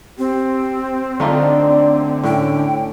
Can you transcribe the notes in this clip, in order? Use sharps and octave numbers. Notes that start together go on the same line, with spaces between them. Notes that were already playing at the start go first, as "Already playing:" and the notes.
C4 G4
D3 A3 D#4 F4 D5
A2 C#4 G5